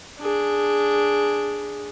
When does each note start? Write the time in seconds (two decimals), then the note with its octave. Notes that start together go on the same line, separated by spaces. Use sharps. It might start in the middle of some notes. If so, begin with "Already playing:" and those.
0.20 D4 G#4